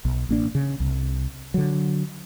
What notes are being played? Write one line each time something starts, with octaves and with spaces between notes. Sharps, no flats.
B1
A1 A#3 D4
C#3
C2
D3 F#3